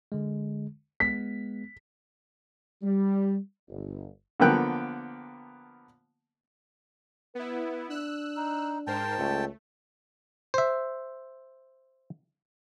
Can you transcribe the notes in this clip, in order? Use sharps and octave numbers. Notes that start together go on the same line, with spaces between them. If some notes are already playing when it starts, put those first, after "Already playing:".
D3 G#3
G#3 B3 B6
G3
G1
D3 F3 A#3 B3 G5 F#6
B3 E4 B4
D4 E6 F#6
D#4
G#2 A#4 C5 G5 A5
C#2 A3
C5 E5